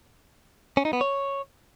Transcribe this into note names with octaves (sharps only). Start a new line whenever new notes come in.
C#4
D#4
B3
C#5